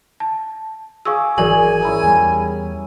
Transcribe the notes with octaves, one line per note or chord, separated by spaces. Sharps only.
A5
G#4 F5 C#6 D6 E6
G#1 E3 F#3 G#4 A#4 D5 G#5 F#7
C#4 E4 A#5
E2 G3